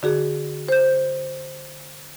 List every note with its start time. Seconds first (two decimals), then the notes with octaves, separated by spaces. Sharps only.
0.03 D3 F#4 G#4
0.69 C5 G6